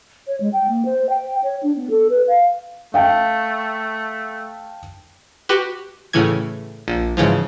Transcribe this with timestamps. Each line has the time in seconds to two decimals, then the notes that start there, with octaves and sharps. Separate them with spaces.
0.27 C#5
0.40 G#3
0.53 G5
0.68 A#3
0.85 C5
1.10 G5
1.43 C#5
1.63 D4
1.76 B3
1.90 A4
2.10 B4
2.28 F5
2.94 A3 F5 G5 A5
5.49 F#4 G4 B4
6.13 A2 C#3 E3 G#6
6.88 A#1
7.17 G#2 C#3 E3 F3